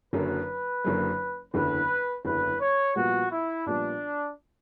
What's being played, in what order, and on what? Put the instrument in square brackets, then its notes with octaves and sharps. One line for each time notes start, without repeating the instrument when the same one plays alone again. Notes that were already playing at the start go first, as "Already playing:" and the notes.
[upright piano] F#1 F#2 D3 F#3 A#3 [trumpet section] B4
[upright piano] F#1 F#2 D3 F#3 A#3
[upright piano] F#1 E2 D3 [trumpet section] B4
[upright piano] F#1 E2 D3 [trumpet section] B4
[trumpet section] C#5
[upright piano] A#1 A#2 G3 B3 [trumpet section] F#4
[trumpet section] E4
[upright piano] A#1 A#2 G3 B3 [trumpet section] D4